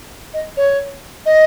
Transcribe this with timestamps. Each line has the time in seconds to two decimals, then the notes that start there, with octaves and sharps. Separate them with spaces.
0.34 D#5
0.57 C#5
1.26 D#5